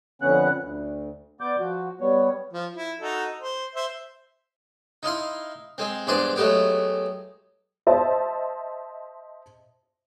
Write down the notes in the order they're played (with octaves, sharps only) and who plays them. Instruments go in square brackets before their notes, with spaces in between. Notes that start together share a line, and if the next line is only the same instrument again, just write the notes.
[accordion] F2 D3 B3 C#4 F#5 F#6
D2
B3 D5 D6 G6
F3 F#4
G3 B3 C#5
[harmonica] F3
E4
D#4 F#4 A4
C5
C5 E5
[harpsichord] D#4 E4 F5 C6
G#3 C4
E2 G2 G#3 C5 D5 C6
F#3 G#3 A3 B3 G4
[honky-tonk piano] C5 D#5 E5 A5